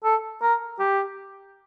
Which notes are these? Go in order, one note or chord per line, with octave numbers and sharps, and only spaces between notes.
A4
A#4
G4